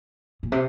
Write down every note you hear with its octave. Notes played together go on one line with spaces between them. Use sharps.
A#2
C3